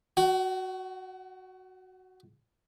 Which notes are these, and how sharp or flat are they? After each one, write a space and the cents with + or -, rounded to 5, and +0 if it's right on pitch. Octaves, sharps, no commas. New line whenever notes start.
F#4 +0 F#5 +40